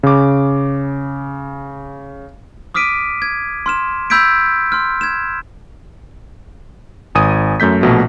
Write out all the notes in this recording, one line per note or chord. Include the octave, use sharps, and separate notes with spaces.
C#3 D6
D6 D#6 F6 B6 D7 D#7
G#6
C6 F6 E7
B5 E6 G6 G#6 B6 D7
C6 F6
G#6 E7
G#1 G#5 D#6 D#7
F#2 A3 G6 B6
A#1 B2 A3